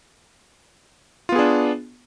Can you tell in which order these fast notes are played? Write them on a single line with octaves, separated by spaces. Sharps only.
F4 B3 G#4 D4